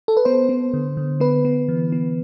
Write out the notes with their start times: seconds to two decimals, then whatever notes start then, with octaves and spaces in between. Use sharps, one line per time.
0.08 A4
0.17 B4
0.25 B3 C5
0.49 B3
0.74 D3
0.97 D3
1.20 B3 B4
1.45 B3
1.69 E3
1.92 B3